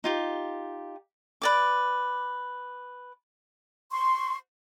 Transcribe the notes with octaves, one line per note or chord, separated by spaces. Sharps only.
D#4 F4 G4
B4 D5 D6
C6 C#6